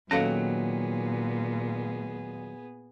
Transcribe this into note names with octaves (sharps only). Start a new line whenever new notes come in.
D#2 A#2 F#3 B3 C#4 G#4 A4 F5